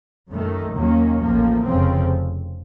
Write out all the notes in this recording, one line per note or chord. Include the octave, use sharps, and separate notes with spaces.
F#2 D#3 A3
D#2 D#3 F#3 A#3 C#4
A1 A2 F3 A#3
F1 F2 C#3 F3 C4